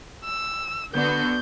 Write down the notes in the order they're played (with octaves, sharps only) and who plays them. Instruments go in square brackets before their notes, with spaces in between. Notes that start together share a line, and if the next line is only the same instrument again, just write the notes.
[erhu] E6
[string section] D3 B3 F#4 [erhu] G6